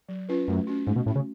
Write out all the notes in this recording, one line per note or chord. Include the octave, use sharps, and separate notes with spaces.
F#3
C#4 F4 B4
F#2 A3
C#4 F#4
G#2 A3
B2
A2 C#4 F#4
C#3